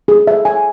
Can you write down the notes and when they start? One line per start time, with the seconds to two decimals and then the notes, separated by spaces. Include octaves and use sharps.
0.08 G#4
0.27 E5
0.45 G#5